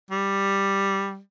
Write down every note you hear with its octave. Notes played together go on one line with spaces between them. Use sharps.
G3